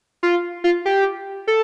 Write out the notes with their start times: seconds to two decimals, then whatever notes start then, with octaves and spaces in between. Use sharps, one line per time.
0.23 F4
0.64 F4
0.86 G4
1.47 A4